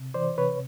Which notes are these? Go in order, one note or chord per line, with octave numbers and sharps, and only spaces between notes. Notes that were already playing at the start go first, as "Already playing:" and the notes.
Already playing: C3
E3 C5 D5
C3 B4 C#5